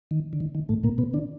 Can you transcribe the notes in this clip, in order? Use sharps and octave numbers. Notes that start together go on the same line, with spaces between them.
D#3
D3
D#3
D#3
A2 A3
A#2 A#3
B2 B3
D3 D4